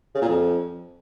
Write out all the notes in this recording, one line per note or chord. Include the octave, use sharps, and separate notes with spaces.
C#3
A#2
F2